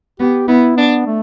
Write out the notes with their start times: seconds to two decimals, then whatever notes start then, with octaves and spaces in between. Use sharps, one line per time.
0.19 B3 G4
0.48 B3 E4
0.77 B3 D4
1.07 A3